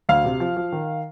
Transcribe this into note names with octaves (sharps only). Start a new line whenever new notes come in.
D2 F5
C3
F3
F3
D#3